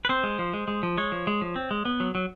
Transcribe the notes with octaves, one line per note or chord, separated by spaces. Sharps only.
B4
C4 C5
G#3
F3
G#3
G#3
F3
G#3 C#5
F3
G#3
F3
C4
G#3
B3
F#3
F#3